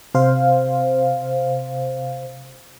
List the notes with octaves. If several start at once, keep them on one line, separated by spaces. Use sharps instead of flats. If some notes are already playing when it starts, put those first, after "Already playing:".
C3 C5 F5